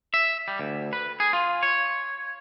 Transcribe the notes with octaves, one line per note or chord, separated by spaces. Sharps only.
E5
G3
D2
B4
G#4
F4
C#5